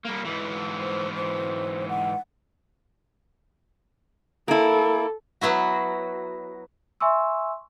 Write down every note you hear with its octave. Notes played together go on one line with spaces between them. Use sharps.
G3 A#3
G#2 E3
C5
C5
F#5
A#3 E4 A4
F#3 B3 E4 F#4
E5 G#5 C6 C#6 E6